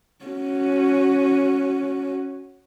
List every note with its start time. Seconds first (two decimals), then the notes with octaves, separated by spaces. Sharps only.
0.25 C#4 F#4